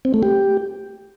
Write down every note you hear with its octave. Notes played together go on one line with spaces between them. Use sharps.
C4
A3
G4